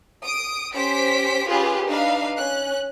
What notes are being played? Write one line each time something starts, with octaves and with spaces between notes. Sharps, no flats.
D#6 D7
C#4 G4 C5 B6 D7
C#4 F4 G4 G#4 B4
D4 D#4 B4 F5
C#4 F#6